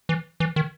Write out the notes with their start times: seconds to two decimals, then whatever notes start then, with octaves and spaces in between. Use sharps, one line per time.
0.09 E3
0.40 E3
0.56 D#3